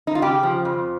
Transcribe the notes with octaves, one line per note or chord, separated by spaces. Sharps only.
D#4
F4
C#3 G4
F3
F2